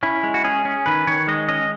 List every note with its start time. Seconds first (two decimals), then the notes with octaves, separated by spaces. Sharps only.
0.03 C#4 E4
0.23 G#3
0.34 F#4
0.44 C#4 G#4
0.65 C#4
0.86 D#3 B4
1.07 D#3 C#5
1.27 G#3 D#5
1.49 C#4 D#5